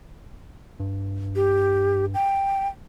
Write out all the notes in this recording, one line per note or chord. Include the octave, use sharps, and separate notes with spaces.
G2
G4
G5